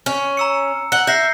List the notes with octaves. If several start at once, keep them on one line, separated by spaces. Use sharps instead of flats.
C#4
A#5 E6 C#7
F#5 C#7 G7
E5 G6 A#6 C7